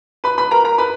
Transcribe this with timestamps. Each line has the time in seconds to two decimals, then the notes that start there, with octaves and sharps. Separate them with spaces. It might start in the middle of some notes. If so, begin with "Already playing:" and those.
0.24 B4 B5
0.38 B4 B5
0.51 A#4 A#5
0.64 A#4 A#5
0.78 B4 B5